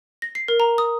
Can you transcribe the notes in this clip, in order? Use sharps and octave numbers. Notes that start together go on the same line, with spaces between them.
A#6
C7
A#4
A#5
D#6